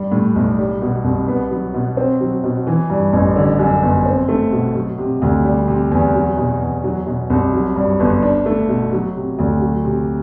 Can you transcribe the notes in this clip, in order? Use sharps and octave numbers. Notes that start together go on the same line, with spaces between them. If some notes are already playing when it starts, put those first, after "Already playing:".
Already playing: G2 G3
A2
B1
G3
B2
C2
B3
F#3
B2
C4
F#3
B2
E3
G2
A1
D3
F#2
G1
C4
A3
B2
F#3
C3
D2
G3
C3
E2
F#3
B2
E2
F#3
B2
C2
F#3
G2
G1
D4
A3
B2
F#3
C3
D2
F#3
C3